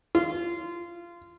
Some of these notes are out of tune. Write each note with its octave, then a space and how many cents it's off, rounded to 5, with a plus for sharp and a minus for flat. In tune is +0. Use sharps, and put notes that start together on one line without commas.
F4 -20